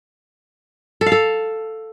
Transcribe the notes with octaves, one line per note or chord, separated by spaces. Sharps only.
A4
F5
A4